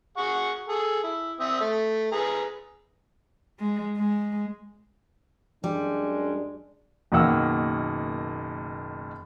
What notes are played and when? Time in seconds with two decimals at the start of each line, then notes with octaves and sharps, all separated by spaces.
0.18 G#4 F#5 C#6
0.68 G#4 A4
1.04 E4
1.40 C4 E5 D#6
1.60 A3
2.12 G#4 B4 A#5
3.59 G#3
3.97 G#3
5.64 F#2 G3 G#3 D4
7.12 F#1 B2 D#3 A#3 F#5 E6